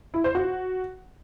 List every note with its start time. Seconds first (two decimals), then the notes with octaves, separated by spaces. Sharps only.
0.14 E4
0.24 C5
0.35 F#4